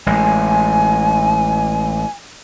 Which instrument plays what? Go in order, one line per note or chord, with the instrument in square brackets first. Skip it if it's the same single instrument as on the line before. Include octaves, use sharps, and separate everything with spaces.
[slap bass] A1 G#3 [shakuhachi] G#5